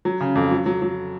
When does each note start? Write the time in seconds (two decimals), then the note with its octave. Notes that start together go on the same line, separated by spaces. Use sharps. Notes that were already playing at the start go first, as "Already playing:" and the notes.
0.05 F#3
0.20 C#3
0.35 F2
0.51 F#3
0.66 F#3
0.82 F#3